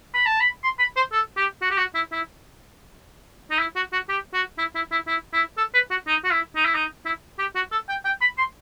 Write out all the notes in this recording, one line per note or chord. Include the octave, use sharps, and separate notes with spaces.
B5
A5
B5
C6
B5
C5
A4
G4
F#4
G4
F#4
E4
E4
D#4
E4
F#4
F#4
G4
F#4
E4
E4
E4
E4
E4
A4
B4
F#4
D#4
F#4
E4
D#4
E4
D#4
E4
G4
F#4
A4
G5
G5
B5
C6